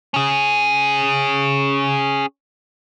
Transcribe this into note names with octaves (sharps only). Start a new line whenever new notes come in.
C#4 G#4